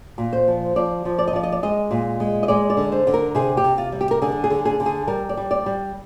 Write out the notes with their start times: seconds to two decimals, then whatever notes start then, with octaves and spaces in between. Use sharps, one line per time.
0.18 A#2
0.33 C5
0.48 F3
0.76 F3 D5
1.05 F3
1.19 D5
1.28 D#5
1.33 F3 D5
1.43 D#5
1.52 D5
1.63 G#3 D#5
1.91 A#2
2.20 G#3
2.43 D#5
2.48 G#3 D5
2.70 D5
2.77 D3
2.92 C5
3.07 D3
3.14 A#4
3.35 C3 G#4
3.57 G4
3.64 C3
3.78 F4
3.92 G3
4.01 G4
4.11 A#4
4.22 D3 G#4
4.44 G#4
4.51 D3
4.65 G#4
4.80 D3
4.86 G#4
5.07 G3 A#4
5.29 D5
5.37 G3
5.51 D5
5.66 G3